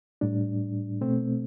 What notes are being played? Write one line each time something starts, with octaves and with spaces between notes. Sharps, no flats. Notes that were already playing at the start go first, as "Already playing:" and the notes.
A2 G3 D4
B2 A3 C4